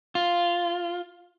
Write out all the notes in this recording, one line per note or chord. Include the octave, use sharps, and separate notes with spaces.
F4